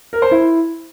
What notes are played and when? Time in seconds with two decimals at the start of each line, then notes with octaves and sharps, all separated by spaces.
0.13 A#4
0.22 C5
0.31 E4